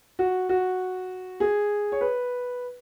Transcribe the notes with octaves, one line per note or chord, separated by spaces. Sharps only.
F#4
F#4
G#4
C#5
B4